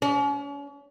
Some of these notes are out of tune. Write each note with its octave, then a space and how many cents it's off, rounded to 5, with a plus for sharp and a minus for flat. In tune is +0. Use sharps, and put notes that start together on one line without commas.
C#4 +40